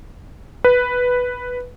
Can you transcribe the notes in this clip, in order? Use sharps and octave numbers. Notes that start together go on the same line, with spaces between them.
B4